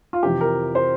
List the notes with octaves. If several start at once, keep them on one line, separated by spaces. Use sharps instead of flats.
F4
F2 C3 E3 G4
A#4
C5